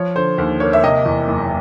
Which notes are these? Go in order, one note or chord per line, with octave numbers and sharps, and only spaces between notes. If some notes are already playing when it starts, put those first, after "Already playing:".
Already playing: F3 C#5
D3 C5
D#2
A#3 C#5
E5
C3 D#5
E2
F#1